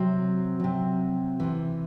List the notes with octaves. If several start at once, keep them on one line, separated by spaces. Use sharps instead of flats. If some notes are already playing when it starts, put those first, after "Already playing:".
Already playing: C3 F#3 C4
C3 F#3
C3 E3